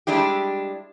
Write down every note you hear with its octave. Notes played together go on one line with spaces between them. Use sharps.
G3 G#3 D4 E4 G4